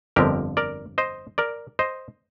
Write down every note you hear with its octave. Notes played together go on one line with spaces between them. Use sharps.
G1 F2 D3 F3 G4 A#4
A#4 D5
C5 D#5
A#4 D5
C5 D#5